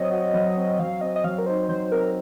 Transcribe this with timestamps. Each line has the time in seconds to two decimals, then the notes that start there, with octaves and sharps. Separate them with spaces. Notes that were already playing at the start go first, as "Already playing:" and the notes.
Already playing: F#3 C4 C#5 D#5
0.11 F#4
0.34 F#3
0.56 C4
0.79 F#3 F5
1.01 C4 D#5
1.16 D#5
1.24 F#3 F5
1.38 A#4
1.46 D#4 C5
1.69 F#3 C5
1.92 C4 A#4